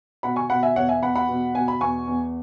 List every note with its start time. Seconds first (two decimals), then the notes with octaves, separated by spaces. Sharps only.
0.23 B2 F#5 B5
0.36 G#5 C#6
0.50 B2 F#5 B5
0.63 E5 G#5
0.76 E2 C#5 F#5
0.89 E5 G#5
1.02 E2 F#5 B5
1.15 F#5 B5
1.29 B2
1.55 B2 G#5
1.68 B5
1.81 E2 G#5 C#6
2.07 E2